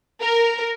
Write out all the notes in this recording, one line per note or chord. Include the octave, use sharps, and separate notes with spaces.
A#4